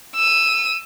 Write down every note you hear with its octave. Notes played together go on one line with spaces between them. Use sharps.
E6 D#7